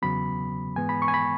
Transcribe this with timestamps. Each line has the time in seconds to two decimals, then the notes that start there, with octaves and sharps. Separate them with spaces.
0.02 E2 C#3 F#3 B3 B5
0.76 G#2 E3 G#3 B3 G#5
0.89 B5
1.02 C#6
1.08 G#5
1.14 B5